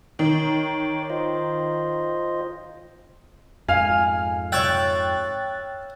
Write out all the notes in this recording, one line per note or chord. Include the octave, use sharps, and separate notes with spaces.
D#3 C#5 D6
F4 C5 D#5
F2 G#2 F5 G#5 F6
C#5 E5 G5 F#6 A6